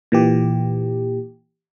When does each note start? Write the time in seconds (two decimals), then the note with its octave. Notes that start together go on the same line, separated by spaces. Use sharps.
0.12 A#2 E3 G4